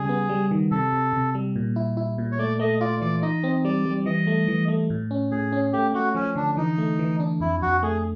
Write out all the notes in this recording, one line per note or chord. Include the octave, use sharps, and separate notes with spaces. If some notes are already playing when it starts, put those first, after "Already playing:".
Already playing: C#3 G3 G#4
B3
G3
D#3
C3 A4
C3
C3
G3
A#2
E4
E4
A#2
C#5
A3 D5
A3 D#5
F4 D5
E3 D5
D#4 D#5
C4
G3 D5
G3
E3 D#5
A3
E3
A3
A2
C#4
A2 G#4
C#4
A3 G4
A3 F#4
F3 C#4
D3 D4
E3 D#4
A3
E3
D4
F2 E4
F2 F#4
A3 G#4